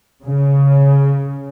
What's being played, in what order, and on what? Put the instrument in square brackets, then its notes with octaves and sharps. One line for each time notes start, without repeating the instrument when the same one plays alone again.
[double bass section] C#3